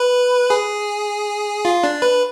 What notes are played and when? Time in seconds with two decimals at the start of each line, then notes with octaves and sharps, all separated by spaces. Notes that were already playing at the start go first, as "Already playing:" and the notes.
Already playing: B4
0.50 G#4
1.65 F4
1.84 D4
2.02 B4